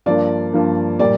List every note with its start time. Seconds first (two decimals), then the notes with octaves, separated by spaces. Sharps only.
0.06 G2 F3 A#3 D5
0.53 G2 F3 A#3
0.99 A#2 G3 A#3 D5